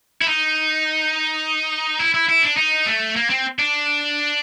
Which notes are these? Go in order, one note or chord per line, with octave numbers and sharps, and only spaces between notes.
E4
D#4
E4
E4
E4
D4
D#4
A3
A#3
C4
D4